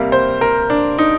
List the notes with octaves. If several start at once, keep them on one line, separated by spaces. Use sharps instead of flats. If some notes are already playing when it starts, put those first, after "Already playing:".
Already playing: C3 G3 A#3 F5
C5
A#4
D4
D#4